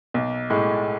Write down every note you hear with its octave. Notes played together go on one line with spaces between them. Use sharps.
B1
A2 G#3